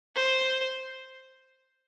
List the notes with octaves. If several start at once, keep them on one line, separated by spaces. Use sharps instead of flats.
C5